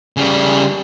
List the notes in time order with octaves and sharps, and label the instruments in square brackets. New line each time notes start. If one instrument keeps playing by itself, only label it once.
[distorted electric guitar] C#3 G3